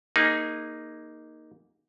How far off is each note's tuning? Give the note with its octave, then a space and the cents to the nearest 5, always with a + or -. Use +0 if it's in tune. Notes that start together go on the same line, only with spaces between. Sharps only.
A#3 +0 D#4 +0 G#4 -25